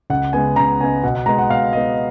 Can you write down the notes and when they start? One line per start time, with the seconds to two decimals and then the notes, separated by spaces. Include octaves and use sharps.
0.10 C#2 F#5
0.33 C#3 G#3 B3 G#5
0.56 C#2 A#5
0.80 C#3 G#3 B3 G#5
1.03 B2 F#5
1.15 F#5
1.26 G#3 B3 A#5
1.38 F#5
1.50 B2 F5
1.73 G#3 B3 D#5